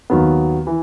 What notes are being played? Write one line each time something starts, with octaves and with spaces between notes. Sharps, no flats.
D#2 D#3 F#3 B3
E3